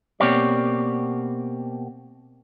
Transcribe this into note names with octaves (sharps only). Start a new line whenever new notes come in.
B2 A#3 C4 G4 C#5 D5